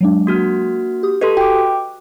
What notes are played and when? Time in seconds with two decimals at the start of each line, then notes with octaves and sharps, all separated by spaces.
0.01 F#3 G#3 D4
0.27 A#3 F#4 F6
1.03 G4 D#6
1.21 G4 A4 B4 D#5 C6
1.37 F#4 G5 D6